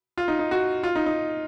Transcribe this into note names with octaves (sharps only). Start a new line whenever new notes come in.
F4
D#4
D#4
F#4
F4
D#4
D#4